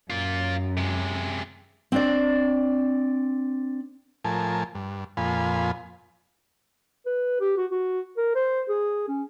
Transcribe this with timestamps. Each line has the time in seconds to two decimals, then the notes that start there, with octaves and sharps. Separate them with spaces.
0.10 F#2 A#3 F4
0.77 C3 G#3
1.92 C4 D4 D5
4.24 A2 F3 A#4 G#5 A5
4.75 G2
5.17 F2 A#2 F4 G#5 B5
7.06 B4
7.40 G4
7.57 F#4
7.71 F#4
8.17 A#4
8.35 C5
8.69 G#4
9.08 C#4